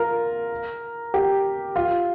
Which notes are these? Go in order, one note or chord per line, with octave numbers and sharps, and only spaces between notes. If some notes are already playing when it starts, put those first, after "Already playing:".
Already playing: F4 A#4
G4
F4